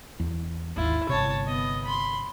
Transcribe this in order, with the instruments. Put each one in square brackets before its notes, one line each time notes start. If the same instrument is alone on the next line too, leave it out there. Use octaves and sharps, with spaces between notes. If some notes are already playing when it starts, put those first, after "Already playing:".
[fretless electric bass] E2
[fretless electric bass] G#1 D#2 [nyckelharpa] E4 F4
[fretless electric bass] G1 C3 [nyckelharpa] C#5 A5
[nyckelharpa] B3 D#5
B5 C6